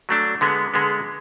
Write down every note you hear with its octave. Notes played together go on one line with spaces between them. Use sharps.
F#3 A3 D4
D3 G#3 B3
D3 G#3 B3